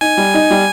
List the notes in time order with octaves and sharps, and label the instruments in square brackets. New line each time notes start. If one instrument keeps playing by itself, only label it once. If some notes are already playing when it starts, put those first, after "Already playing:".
[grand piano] D#4 [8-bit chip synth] G#5
[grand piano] G3
D#4
G3